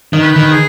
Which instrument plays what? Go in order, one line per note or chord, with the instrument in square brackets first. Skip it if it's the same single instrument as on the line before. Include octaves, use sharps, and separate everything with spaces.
[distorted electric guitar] D#3
[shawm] B4
[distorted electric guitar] D#3
[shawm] G#4